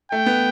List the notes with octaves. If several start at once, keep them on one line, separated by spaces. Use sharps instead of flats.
A3 G5
B3